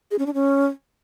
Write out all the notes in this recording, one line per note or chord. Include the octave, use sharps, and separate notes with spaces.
G#4
C#4
D4
C#4